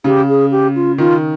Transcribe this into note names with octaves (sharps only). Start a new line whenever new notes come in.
C#3 G4
G#4
G4
F4
D#3 F4